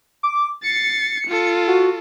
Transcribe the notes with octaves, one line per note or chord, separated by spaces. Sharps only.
D6
A6 C7 C#7
F4 A4
F#4